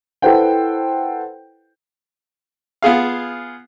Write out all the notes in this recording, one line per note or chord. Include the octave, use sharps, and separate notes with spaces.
E4 A4 B4 C5 F#5 G5
B3 F4 G#4 F5